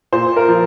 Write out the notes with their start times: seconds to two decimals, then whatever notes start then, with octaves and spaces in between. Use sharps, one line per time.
0.12 A#2 C5
0.36 A#4
0.48 F3